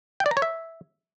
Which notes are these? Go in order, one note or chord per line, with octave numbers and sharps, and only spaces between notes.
G5
D5
A#5
C#5
E5